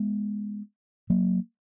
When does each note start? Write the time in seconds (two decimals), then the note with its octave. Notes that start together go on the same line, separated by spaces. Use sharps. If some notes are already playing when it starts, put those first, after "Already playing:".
Already playing: G#3 B3
1.10 F#3 A#3